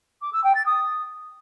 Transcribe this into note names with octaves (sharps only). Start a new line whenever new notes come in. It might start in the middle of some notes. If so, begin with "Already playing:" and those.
D6
E6
G5
A6
D#6